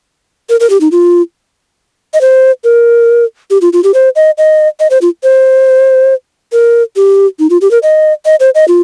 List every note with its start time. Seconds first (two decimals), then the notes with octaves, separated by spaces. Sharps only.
0.50 A#4
0.60 A#4
0.70 G4
0.81 D#4
0.92 F4
2.14 D#5
2.21 C5
2.64 A#4
3.50 G4
3.62 F4
3.73 F4
3.84 G4
3.94 C5
4.16 D#5
4.38 D#5
4.80 D#5
4.91 C5
5.02 F4
5.23 C5
6.52 A#4
6.96 G4
7.39 D#4
7.50 F4
7.61 G4
7.71 A#4
7.83 D#5
8.25 D#5
8.40 C5
8.55 D#5
8.68 F4